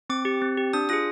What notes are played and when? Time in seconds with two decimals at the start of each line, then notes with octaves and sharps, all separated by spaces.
0.10 C4 D6
0.25 G4
0.42 C4
0.58 G4
0.73 D4 D#6
0.89 F4 G#4 D#6